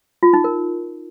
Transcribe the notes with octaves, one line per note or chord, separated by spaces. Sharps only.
F4
D#4
A#4